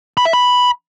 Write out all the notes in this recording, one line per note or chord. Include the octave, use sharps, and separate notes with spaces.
B5
E5
B5